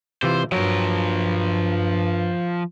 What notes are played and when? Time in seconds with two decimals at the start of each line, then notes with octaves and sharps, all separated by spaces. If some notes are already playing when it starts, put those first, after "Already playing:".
0.23 C3 E3 F4 C5
0.52 G2 F3 F#3 A#4